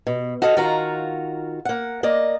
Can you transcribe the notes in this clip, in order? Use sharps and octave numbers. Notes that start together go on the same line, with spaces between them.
B2
F#4 A4 D#5 F5
D#3 F4 F#4 F5 A#5
A#3 F#5
A#3 D5 D#5